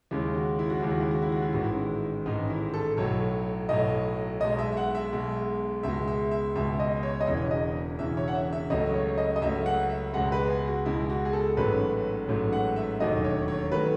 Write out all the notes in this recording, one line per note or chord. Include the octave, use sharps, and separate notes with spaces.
D#2 C#3 G#3 E4
F#4
E4
F#4
D#2 C#3 G#3 E4
F#4
E4
F#4
E4
F#4
E4
A1 G#2 D#3 G#3 F#4
E4
A1 G#2 D#3 G#3 D#4
E4
A4
B1 A2 F#3 C#5
B1 A2 F#3 D#5
B1 B2 G#3 D#5
E5
E5
F#5
E5
B1 B2 G#3
C#2 B2 G#3 E5
E5
E5
C#2 B2 G#3 E5
D#5
C#5
D#5
E1 E2 C#3 E3 C#5
D#5
E1 E2 C#3 E3 E5
C#5
F#5
E5
E5
C#2 C#3 F#3 A3 D#5
C#5
D#5
D#5
C#2 C#3 F#3 A3 E5
F#5
E5
C#2 B2 G#3 F#5
B4
G#4
F#4
C#2 B2 G#3 E4
F#4
G#4
A4
A1 G#2 F#3 A3 B4
A1 G#2 F#3 A3
F#5
E5
E1 D#2 D#3 F#3 A3 D#5
C#5
C#5
D#3 F#3 A3 B4